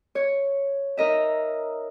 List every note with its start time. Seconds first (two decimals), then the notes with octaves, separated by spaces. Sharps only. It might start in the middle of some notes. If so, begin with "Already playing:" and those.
0.15 C#5
0.97 D#4 A#4 D#5 E5